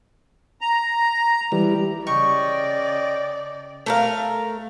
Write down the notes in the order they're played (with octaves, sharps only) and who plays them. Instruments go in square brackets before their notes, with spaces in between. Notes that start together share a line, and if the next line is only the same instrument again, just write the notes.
[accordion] A#5
[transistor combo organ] E3 G3
[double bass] C#3 [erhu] D5 [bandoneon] D#5 G5 [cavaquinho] C#6
[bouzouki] A3 A#4 F5